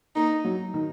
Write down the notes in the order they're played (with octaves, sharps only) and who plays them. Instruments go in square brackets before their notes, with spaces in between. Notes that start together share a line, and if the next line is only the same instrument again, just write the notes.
[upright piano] A#3 [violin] D#4
[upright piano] F#3
D#3